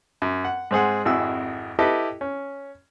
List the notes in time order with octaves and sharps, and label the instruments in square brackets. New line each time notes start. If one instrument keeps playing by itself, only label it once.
[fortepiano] F#2
F#5
G#2 C4 G#4 F#5
G#1 F2 E4 F#4 G#4 E6
E4 G4 A4 B4 D#5
C#4